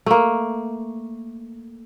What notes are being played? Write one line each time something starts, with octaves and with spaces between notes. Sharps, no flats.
A3 A#3